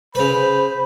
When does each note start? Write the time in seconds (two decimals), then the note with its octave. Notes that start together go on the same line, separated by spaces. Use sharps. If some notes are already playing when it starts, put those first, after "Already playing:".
0.15 C#3 B4 C5 B5